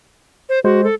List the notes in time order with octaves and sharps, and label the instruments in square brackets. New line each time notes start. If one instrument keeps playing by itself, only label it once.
[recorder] C5
[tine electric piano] G#3 C5 [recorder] F#4
[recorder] A4